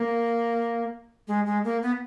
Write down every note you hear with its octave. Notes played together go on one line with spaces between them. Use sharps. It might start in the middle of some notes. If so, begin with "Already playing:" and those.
Already playing: A#3
G#3
G#3
A#3
B3